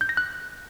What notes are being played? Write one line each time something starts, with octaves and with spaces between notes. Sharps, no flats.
G6
A#6
F#6